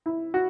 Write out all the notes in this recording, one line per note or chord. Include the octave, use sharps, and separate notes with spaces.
E4
F#4